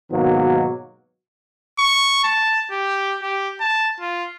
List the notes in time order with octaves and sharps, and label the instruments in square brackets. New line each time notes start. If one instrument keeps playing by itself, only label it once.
[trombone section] G#2 B2 D#3 F#3 A#3 B3
[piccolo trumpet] C#6
A5
G4
G4
A5
F4